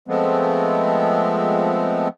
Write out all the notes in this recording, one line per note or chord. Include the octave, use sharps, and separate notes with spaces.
F3 G#3 A3 B3 C4